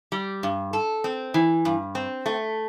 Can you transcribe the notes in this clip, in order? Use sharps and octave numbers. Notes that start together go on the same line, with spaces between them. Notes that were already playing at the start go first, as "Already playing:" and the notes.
G3
G2
A4
C4
E3
G2
C4
A3